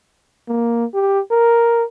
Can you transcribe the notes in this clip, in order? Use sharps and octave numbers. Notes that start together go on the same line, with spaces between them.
A#3
G4
A#4